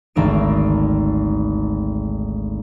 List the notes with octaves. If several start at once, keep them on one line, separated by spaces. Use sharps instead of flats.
G#1 D2 A#4 E6 D7